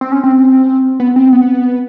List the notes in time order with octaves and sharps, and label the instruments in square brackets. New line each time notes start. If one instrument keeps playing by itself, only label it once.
[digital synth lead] C4
C#4
C4
B3
C4
B3